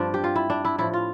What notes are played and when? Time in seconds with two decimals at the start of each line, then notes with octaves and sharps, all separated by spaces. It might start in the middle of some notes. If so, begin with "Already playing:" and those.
Already playing: G2 F3 C4 D4
0.14 G4
0.24 F4
0.35 E4
0.50 D4
0.65 E4
0.79 A2 F3 E4
0.93 F4